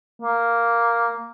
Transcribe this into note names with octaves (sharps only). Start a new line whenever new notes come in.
A#3